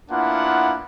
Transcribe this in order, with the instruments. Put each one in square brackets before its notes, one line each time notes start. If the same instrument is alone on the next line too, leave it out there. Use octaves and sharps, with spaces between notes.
[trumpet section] A#3 B3 D4 E4 F4 F#5